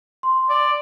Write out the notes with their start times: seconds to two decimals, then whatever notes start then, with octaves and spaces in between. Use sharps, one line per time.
0.23 C6
0.49 D5